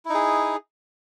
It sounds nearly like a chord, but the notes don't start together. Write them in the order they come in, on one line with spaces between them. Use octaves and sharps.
E4 D#4 G#4